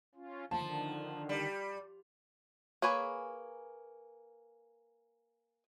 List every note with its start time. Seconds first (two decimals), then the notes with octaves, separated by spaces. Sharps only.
0.15 C#4 F4
0.51 D3 D#3 F3 A5
1.29 G3
2.82 A#3 G#4 B4 C#5 G#5